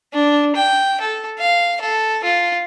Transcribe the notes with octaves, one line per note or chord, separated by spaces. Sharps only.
D4
G5
A4
F5
A4
F4